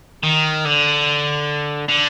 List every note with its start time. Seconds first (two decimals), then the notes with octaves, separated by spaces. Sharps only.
0.23 D#3
0.65 D3
1.89 D3